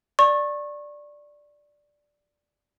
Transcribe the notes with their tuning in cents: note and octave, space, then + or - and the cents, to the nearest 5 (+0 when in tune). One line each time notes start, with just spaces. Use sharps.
D5 +0 C#6 -25